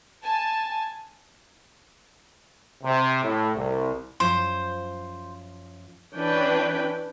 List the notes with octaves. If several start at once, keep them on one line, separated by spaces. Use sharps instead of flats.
G#5 A5
C3
A2
C2
F#2 F3 F4 C5
E3 C#4 D4 B4 G5